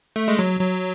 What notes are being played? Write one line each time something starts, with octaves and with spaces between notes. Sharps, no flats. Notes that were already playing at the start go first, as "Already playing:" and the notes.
A3
G#3
F#3
F#3